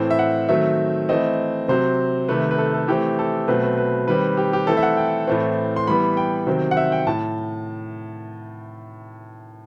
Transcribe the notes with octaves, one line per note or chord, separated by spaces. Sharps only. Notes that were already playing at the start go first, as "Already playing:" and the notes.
Already playing: A2 E3 A3 C4
E5
F#5
D#3 F#3 A3 C4 E5
E3 A3 C4 D#5
C3 F#3 C4 C5
C3 D#3 A3 B4
B4
A4
A4
E3 A3 C4 G4
A4
B2 F#3 A3 C4 B4
B4
B4
D#3 G3 C4 B4
G4
G4
E3 A3 C4 A4
E5
F#5
G5
A2 E3 A3 C4
C6
E3 G3 B3 B5
G5
C3 D#3 F#3 C4
F#5
E5
G5
A2 A5